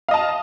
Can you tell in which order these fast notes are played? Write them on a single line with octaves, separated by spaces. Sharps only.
F5 D#5 A5